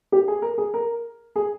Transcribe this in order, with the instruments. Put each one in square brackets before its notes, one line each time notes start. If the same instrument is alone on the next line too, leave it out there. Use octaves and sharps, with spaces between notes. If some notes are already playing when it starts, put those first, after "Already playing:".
[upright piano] G4
G#4
A#4
G#4
A#4
G#4